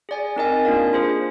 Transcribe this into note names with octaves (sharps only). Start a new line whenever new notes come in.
G#4 D5 G#5
C4 D#4 A#4 D#5 G#5
A#3 D4 F4 A#4 F5
F4 G#4 C5